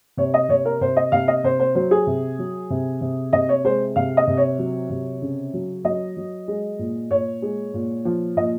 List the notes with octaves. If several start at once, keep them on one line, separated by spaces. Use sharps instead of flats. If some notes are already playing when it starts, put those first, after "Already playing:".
C3 C#5
D#5
C3 C#5
A#4
C3 C5
D#5
C3 F5
D#5
C3 C5
C5
F#3 C5
G#4
C3
F#3
C3
C3
C3 D#5
C#5
G#3 C5
C3 F5
D#5
C3
C#5
F#3
C3
C#3
F#3
F#3 D#5
F#3
G#3
A#2
A#2 C#5
G#3
A#2
F3
A#2 D#5